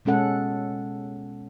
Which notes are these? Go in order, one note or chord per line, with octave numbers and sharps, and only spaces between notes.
B2 G#3 C#4 A4 F#5